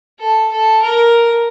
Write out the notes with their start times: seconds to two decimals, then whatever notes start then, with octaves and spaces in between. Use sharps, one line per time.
0.20 A4
0.51 A4
0.82 A#4